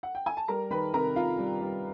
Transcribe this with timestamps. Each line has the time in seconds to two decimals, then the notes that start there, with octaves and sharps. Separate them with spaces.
0.03 F#5
0.15 G5
0.26 G#5
0.37 A5
0.48 G3 A#4 A#5
0.70 D#3 B4 B5
0.94 C3 A#4 A#5
1.16 C3 F4 F5
1.39 G3
1.61 G3